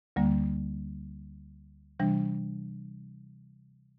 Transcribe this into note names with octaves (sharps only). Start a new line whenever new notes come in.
D2 D3 G3 A#3
C3 E3 G3 D4